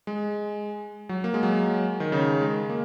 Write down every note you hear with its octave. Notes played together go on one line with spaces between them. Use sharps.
G#3
F#3
A#3
G#3
F#3
D#3
C#3
G#3
A#3